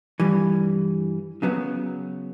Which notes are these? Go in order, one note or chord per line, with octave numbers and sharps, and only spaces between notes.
G2 E3 G3
C#3 F#3 B3